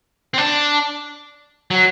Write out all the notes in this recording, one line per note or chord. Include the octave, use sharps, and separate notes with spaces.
C4
D4
F#3